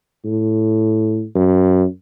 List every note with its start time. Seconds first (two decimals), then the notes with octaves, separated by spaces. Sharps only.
0.25 A2
1.35 F#2